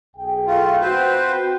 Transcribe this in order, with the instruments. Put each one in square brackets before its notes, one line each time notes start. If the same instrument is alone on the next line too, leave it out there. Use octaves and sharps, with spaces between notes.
[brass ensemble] B1 G#4 G5
[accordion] A3 F4
[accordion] C4 B4 C5 [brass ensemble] F#4